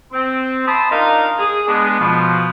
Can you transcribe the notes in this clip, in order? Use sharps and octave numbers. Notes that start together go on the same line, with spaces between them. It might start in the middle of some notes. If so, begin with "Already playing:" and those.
C4
E5 A5 B5 C6 D#6
D4 D#4 F4 A#4 D#5 F5
G#4
G#3 B3 D4
B2 F3